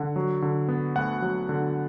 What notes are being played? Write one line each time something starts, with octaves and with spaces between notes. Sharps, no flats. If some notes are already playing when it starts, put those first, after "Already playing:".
Already playing: D3 F#5
F#3
D3
B3
D2 F#5
F#3
D3